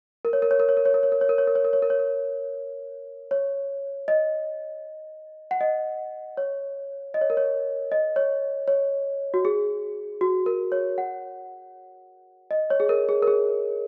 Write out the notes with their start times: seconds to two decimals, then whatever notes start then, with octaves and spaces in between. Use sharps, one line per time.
0.25 A#4
0.33 C#5
0.42 A#4
0.51 C#5
0.60 A#4
0.69 C#5
0.77 A#4
0.85 C#5
0.94 A#4
1.03 C#5
1.12 A#4
1.21 C#5
1.29 A#4
1.38 C#5
1.47 A#4
1.55 C#5
1.65 A#4
1.73 C#5
1.82 A#4
1.90 C#5
1.99 A#4
3.31 C#5
4.08 D#5
5.51 F#5
5.61 D#5
6.37 C#5
7.14 D#5
7.21 C#5
7.30 A#4
7.37 C#5
7.92 D#5
8.16 C#5
8.68 C#5
9.34 F#4
9.45 G#4
10.21 F#4
10.46 A#4
10.72 C#5
10.98 F#5
12.51 D#5
12.70 C#5
12.80 G#4
12.89 A#4
13.09 G#4
13.23 A#4
13.27 G#4